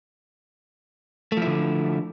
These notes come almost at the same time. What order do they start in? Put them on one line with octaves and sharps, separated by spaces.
A3 F3 E4 D3